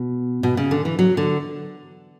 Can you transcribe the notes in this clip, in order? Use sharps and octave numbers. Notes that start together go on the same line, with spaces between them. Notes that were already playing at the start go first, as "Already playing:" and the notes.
Already playing: B2
B2
C#3
D3
E3
F#3
D3